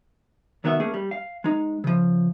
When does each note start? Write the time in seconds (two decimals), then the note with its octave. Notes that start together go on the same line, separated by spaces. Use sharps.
0.64 C2 D#3 B3 F#4 E5
0.80 A3 A#3 C#4 G#4
0.94 G3
1.11 F5
1.44 G#3 D#4
1.84 C#3 F3